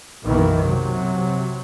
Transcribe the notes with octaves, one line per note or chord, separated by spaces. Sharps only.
B1 F#2 B2 D#3 E3 A#3
C3 F#3